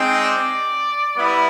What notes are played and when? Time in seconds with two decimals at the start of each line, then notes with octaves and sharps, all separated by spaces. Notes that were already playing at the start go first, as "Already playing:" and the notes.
Already playing: G#3 C4 D#4
0.22 D5
1.16 G3 B3 E4